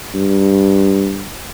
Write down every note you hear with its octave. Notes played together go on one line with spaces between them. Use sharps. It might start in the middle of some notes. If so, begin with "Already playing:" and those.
G2